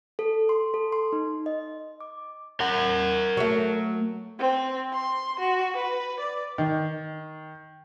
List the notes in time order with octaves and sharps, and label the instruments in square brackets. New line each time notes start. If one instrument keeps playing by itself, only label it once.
[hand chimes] A4
C6
A4
C6
D#4
D#5
D6
[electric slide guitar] A#4 F#5
[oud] F#3 A3
[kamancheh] C4
C6
F#4
B4
D5
[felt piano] D#3